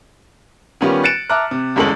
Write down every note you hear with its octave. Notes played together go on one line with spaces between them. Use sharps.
D#3 G3 B3 C#4 F4 G4
F#6 A6 C#7 D7 E7
E5 A5 A#5 D6 F6 F#6
C3
G1 E2 G#3 C#4 A4 F#7